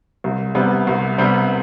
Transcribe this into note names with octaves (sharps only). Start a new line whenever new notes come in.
C2
C3 G3 B3
C2
C3 G3 B3